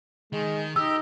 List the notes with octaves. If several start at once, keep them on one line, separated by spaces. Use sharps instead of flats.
D#3 G#3
D#4 G4 E6